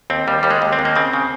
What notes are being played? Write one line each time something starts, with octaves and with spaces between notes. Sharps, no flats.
D#2 C4
D#2 G3
D#2 G3
G#3
D#2
C4
D#2
A#3
C#3 C4
C#3